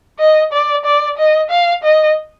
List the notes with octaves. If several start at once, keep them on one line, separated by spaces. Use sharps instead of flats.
D#5
D5
D5
D#5
F5
D#5